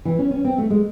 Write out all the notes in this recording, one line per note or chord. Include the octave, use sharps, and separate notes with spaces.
E3
C#4
C#4
C4
A3
G#3